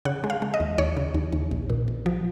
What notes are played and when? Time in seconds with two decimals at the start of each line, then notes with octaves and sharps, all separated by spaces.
0.05 C#3 F#5
0.24 G#3
0.30 F5
0.42 G#3
0.54 D#5
0.60 D#2
0.78 D#2 C#5
0.97 C#3
1.14 D#2
1.32 D#2
1.51 A#1
1.70 A#2
1.88 A#1
2.06 F3